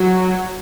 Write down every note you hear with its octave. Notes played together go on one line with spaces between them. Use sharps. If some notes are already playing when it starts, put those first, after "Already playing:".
Already playing: F#3